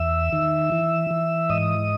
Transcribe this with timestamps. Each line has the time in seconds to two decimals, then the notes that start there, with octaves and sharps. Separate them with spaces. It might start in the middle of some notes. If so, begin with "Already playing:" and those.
Already playing: E2 E5 E6
0.33 D#3
0.72 E3
1.11 E3
1.50 G#2 D#5 D#6